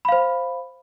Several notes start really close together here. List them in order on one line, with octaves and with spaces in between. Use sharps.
B5 F5 C5